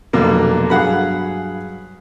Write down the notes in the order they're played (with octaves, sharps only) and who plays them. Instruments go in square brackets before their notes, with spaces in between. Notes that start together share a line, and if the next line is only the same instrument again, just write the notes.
[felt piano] F1 B1 [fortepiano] B2 D3 A#3
[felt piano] G2 F#3 F5 [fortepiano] G#4 F#5 B5